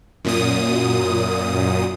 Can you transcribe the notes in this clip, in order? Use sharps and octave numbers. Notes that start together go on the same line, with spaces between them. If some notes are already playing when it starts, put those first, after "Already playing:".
F#2 A#2 D#6